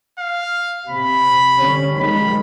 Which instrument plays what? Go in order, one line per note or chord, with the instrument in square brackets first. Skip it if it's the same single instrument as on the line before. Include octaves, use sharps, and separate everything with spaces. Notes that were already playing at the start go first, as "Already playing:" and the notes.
[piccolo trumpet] F5
[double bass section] C3 [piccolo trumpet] B5
[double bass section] D3 G3 C#4
[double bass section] D#3 F3 G#3 [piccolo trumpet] B5